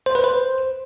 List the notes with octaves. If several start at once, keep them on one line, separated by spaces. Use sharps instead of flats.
C5
B4
C5